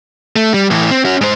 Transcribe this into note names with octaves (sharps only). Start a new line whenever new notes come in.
A3
G3
A2 E3
C4
C#4 F#4
G#2 C5